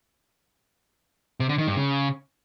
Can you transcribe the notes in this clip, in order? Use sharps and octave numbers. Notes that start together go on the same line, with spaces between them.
C3
D3
D#3
G2
C#3